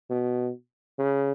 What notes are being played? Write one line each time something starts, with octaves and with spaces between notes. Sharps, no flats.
B2
C#3